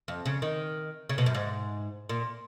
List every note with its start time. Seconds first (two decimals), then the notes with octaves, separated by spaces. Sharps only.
0.08 F2
0.26 C#3
0.42 D#3
1.09 C#3
1.18 B2
1.26 F#2
1.34 G#2
2.09 A#2